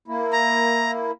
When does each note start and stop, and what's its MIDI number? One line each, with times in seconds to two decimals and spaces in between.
0.08 1.11 58
0.08 1.11 64
0.32 0.91 82